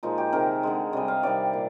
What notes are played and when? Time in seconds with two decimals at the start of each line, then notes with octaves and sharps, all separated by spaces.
0.03 A#2 F3 G#3 D#4
0.18 G4
0.32 C3 D#3 G#3 A#4
0.63 D3 G#3
0.93 C3 G3 D#5
1.08 F5
1.23 C3 D#3 G3 D5
1.53 A#2